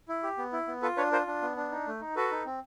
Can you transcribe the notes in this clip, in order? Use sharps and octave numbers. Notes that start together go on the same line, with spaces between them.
E4
G4
B3
E4
B3
F4 A4 B4
D4 B4 C#5
F4 A#4 C5
D4
B3
D4
D#4
A3
D#4
F#4 A4 B4
D#4
C4